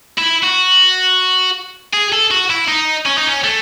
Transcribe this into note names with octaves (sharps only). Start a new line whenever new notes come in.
E4
F#4
G#4
A4
F#4
E4
D#4
C#4
D#4
C#4
A3